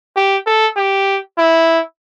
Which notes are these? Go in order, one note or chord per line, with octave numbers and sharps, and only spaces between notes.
G4
A4
G4
E4